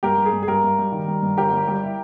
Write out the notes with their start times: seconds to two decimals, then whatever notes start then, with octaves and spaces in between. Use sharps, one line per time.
0.03 G2 G4 A#4
0.18 G2
0.26 G#4
0.33 G2
0.43 G#4
0.48 G2 G4 A#4
0.64 G2
0.79 G3
0.92 D#3
1.08 G3
1.22 G2
1.37 G1 G4 A#4
1.53 G3
1.68 G3
1.83 E4